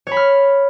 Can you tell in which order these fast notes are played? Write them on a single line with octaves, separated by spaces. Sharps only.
C#5 B5 F6